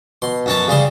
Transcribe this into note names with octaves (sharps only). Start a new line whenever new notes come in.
B2 C6
F#2 C#4 A5
C#3 G3 G#4 C6